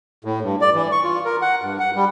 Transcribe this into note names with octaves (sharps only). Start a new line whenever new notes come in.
A2
G2
D5
E3
C#6
F4
A#4
F#5
G2
F#5
G3